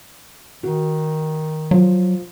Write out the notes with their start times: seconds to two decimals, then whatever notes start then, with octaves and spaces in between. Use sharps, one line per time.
0.63 D#3 F#4
1.71 F3 F#3